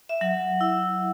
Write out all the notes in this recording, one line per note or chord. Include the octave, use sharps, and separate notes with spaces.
E5
F#3 F#5
E4